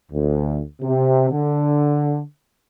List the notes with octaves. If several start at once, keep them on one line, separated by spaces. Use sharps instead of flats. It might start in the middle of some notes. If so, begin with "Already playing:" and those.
D2
C3
D3